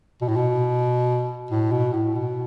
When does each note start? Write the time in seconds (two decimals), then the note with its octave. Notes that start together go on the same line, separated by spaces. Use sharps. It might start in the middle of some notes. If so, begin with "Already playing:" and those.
0.22 B2
0.29 A2
0.36 B2
1.51 A2
1.71 B2
1.93 A2
2.15 B2